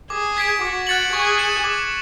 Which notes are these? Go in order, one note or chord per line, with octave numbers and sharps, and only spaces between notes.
G#4 D6
G#6 B6 D7
F#4 D6
F#6 A6 C#7 F#7
G#4 C#6
F#6 C#7 E7
D6